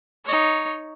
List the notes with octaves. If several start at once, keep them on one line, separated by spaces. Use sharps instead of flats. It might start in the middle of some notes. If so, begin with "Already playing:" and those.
D#4 C#5